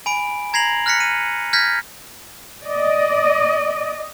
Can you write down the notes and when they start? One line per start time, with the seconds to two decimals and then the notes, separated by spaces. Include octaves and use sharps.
0.06 G#5 B5 D7
0.53 A#5 G#6 A#6 C7 F7 F#7
0.86 F6 F#6 A#6 B6 C#7
1.00 D#7
1.53 F6 G6 G#6 A#6 B6
2.65 D5 D#5